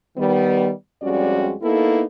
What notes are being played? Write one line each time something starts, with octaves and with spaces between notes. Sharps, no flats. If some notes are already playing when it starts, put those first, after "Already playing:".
D#3 G3 B3
F2 G3 G#3 C#4 F#4 D5
A#3 B3 D#4 E4 A4